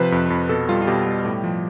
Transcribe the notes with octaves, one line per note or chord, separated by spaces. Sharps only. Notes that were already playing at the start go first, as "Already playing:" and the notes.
Already playing: C3 F3 B4 C5
F2
F2
B2 A4
G3 F4
F4
B2 G4
G3
A2
F3